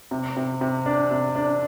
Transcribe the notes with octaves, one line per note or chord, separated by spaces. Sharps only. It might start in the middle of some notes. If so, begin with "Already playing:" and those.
C3
C3
C3
D4
C3
D4